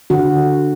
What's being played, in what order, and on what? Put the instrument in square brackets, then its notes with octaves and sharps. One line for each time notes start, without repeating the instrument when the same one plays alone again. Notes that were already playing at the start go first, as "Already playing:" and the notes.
[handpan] D3 F#4